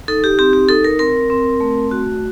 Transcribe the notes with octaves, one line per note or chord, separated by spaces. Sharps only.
D#4 A4
G4
C4 G4
G4
D#4 A4
A#4
C4 A#4
C4
A3
F#4